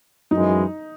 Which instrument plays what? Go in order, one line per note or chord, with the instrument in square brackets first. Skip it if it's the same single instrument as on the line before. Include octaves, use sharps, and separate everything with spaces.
[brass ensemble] F#2 E3 G#3 [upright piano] D#4